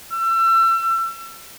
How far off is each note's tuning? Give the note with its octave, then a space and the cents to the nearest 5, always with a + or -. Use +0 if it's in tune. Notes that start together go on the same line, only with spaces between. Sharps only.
E6 +35